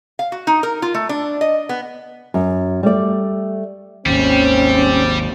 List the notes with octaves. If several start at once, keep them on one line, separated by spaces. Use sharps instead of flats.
F5
F#4
D#4
A#4
F4
A3
D4
D#5
B3
F#2
G3 A3 D5
G#1 D#2 G3 C4 C#4